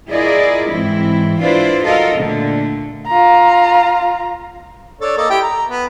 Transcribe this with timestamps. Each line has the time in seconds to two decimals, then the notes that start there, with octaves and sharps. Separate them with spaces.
0.11 E4 F4 G#4 A#4 D5 D#5
0.70 G#2 E3 C4 E4
1.41 D4 E4 F4 B4 C5 D5
1.85 D#4 F4 F#4 A4 A#4 D#5
2.16 A#2 D3 A3
3.07 F4 A#5
5.01 D4 A4 C#5
5.17 A#3 A4 D#5
5.30 E4 G4 G5
5.42 A#5
5.69 B3